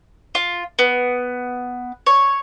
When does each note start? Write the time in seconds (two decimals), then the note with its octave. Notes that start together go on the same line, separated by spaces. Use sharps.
0.35 F4
0.79 B3
2.07 C#5